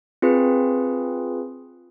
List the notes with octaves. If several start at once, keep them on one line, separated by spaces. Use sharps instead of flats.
C4 F4 G#4 B4